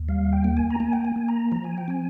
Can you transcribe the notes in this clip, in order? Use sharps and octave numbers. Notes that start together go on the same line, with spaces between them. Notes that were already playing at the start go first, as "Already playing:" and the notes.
Already playing: D#2
G3 F5
G5
A#3
G#5
A#5
A#3 G#5
G5
G#5
A#3
A#5
F3 A#5
G#5
G5
C4 G#5